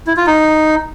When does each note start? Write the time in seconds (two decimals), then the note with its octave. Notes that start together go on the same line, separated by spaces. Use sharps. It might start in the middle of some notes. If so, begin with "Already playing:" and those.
0.07 E4
0.17 F4
0.27 D#4